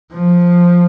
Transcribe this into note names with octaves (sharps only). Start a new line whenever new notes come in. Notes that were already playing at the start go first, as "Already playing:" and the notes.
F3